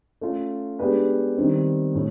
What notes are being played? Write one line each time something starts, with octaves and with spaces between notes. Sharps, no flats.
A3 C#4 F4
G#3 B3 D4 G4 B4
D#3 G3 C4
A2